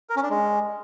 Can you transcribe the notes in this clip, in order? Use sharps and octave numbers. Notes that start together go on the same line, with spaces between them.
A#4
C#4
D4
G#3